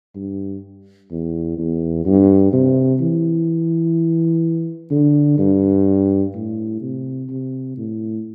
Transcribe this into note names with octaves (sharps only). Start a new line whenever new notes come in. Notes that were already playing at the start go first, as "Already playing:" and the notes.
G2
E2
E2
G2
C3
E3
D3
G2
A2
C3
C3
A2